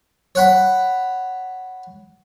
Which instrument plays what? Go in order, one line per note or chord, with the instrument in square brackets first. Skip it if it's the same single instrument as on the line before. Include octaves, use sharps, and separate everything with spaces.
[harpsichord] C#5 F#5 B5